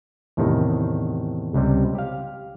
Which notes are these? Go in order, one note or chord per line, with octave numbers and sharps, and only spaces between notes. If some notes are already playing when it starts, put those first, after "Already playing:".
E2 A2 C3 D#3
C#2 C3 G3
G4 F5